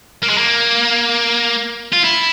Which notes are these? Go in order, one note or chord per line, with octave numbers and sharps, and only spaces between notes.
A#3
G#3
A#3
F4
E4